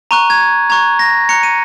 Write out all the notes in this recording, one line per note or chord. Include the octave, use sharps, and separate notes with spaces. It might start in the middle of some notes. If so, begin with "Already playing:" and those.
A#5 C#6 F#6 D#7
G#6
A#5 C#6 F#6 G#6
A#6
A#5 C#6 F#6 C#7
D#7